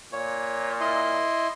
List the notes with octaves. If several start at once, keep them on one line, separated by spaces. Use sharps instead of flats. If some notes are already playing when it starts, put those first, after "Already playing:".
A#2 C#5
E4 D#5 C6